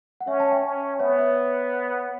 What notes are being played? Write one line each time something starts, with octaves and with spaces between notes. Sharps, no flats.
F#5
C#4 C#5 E5
A5
E5 G5
C#4
B3 C#5 E5
C#5 E5